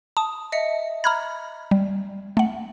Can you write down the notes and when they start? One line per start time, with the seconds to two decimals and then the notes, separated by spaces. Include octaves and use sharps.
0.17 A5 D#6
0.52 D#5 E5 C#7
1.04 A#5 B5 F6 G#6
1.71 G3
2.37 A3 F#5